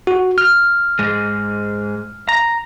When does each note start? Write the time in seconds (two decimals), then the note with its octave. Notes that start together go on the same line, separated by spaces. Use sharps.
0.07 F#4
0.38 F6
0.99 G#2 G#3
2.29 A#5